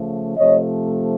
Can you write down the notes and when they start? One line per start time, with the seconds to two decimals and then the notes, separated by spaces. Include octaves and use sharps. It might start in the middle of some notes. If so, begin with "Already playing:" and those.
Already playing: C#3 F3 A3
0.37 C3 F3 A3 C#5 D#5